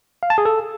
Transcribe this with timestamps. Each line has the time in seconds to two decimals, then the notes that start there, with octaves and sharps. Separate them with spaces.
0.23 F5
0.30 A5
0.38 G#4
0.45 A4